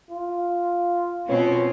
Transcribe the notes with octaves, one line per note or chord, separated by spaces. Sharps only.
F4
B2 C4 C#4 F4 B4 C#5